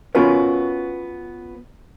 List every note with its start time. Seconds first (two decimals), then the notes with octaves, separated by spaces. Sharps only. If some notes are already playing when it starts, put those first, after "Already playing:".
0.15 B3 C#4 F4 F#4 A#4 B4